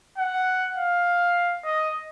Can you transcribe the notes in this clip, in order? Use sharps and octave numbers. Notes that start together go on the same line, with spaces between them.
F#5
F5
D#5